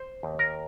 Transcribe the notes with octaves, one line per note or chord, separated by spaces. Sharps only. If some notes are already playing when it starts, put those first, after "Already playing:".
Already playing: C5
D#2
A#4